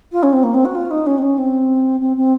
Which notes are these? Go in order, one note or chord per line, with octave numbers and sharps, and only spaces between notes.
F4
C#4
C4
A#3
C4
F#4
F4
D#4
C#4
C4
C#4
C4
C4
C4